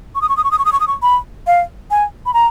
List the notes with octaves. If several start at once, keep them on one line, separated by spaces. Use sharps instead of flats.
C#6
D#6
C#6
D#6
C#6
D#6
C#6
D#6
C#6
D#6
C#6
B5
F5
G#5
B5
A#5